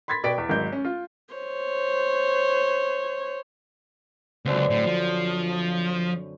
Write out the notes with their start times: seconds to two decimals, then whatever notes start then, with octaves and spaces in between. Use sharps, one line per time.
0.08 B5 C6 G#6 A6 B6
0.23 B2 B4 D5 G5 B6 D7
0.38 E2
0.49 G#1 F#3 G#3 G6
0.73 C#4
0.85 F4
1.34 C5 C#5
4.45 C#2 F#2 D3 C4
4.70 A2
4.86 F3